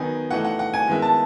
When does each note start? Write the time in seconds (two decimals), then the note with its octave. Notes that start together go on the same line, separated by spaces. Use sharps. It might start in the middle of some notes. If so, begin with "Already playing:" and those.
Already playing: D#3 F#3 B3 D#4 G#5
0.31 E3 A3 D#4 F#5
0.44 F#5
0.59 F#5
0.74 G#5
0.88 D#3 G#3 B3 E4
1.02 A5